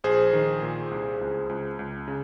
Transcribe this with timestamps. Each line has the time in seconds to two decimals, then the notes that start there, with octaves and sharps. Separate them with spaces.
0.04 A#1 G#4 C5
0.33 D#3
0.62 A#2
0.91 C2
1.21 C#2
1.49 C#2
1.79 C#2
2.08 C#3